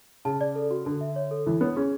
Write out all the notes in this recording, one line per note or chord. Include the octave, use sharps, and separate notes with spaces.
C#3 A5
D5
A4
F#4
D3 A4
E5
C#5
A4
E3 E4
B3 C#5
C#4 G#4